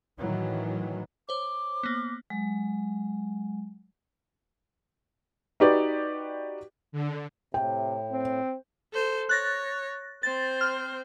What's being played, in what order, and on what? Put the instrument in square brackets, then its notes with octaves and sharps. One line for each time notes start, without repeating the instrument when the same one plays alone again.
[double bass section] A2 D#3 E3 F#3
[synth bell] C5 C#5 [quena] D6
[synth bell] A#3 B3
[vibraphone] F#3 G#3
[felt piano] D#4 F#4 G4 B4 D5
[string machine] D3
[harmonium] A2 [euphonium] C3 [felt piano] G5
[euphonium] C4
[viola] A4 C5
[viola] C#5 [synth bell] F#6 A6 A#6
[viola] C4 C5 [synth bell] A6
[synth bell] F6